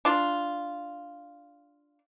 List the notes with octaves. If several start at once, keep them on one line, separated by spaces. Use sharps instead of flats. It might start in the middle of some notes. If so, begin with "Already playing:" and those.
D4 F4